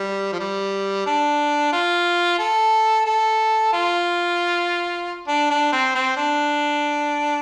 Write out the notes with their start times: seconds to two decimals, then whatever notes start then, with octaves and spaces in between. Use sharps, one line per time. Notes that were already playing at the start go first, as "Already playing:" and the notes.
Already playing: G3
0.33 F3
0.40 G3
1.06 D4
1.73 F4
2.39 A4
3.06 A4
3.73 F4
5.28 D4
5.50 D4
5.72 C4
5.95 C4
6.17 D4